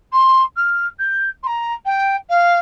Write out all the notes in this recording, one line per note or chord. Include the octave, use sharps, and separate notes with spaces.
C6
F6
G6
C6
A#5
G5
F5